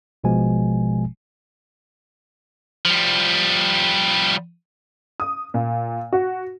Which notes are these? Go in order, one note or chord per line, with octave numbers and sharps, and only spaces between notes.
A1 B2 F3 G#3 G#5
F3 G3
D#6
A#2
F#4